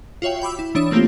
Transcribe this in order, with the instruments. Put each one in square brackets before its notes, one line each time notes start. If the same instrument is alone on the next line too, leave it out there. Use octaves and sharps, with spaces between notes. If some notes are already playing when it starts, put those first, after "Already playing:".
[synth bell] F4 F#4 C#5 E5 G5
G5 B5 D6 E6
E4
E3 D4 C#5 D#6 E7
A3 A#3 C4 D4 F4 G4